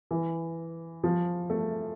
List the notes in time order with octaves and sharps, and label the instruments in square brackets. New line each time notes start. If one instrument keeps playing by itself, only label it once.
[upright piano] E3
F3
A3